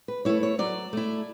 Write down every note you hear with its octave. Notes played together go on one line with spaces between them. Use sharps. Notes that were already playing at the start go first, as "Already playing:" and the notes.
B4
A3 E4 C#5
C#5
F#3 D5
A3 E4